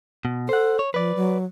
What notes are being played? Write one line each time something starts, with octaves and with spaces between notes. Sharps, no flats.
B2
A4 C5 F#5
C#5
F3 B4 D5
F#3